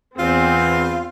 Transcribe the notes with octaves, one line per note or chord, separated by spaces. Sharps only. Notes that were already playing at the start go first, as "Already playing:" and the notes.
E2 E3 C4 F4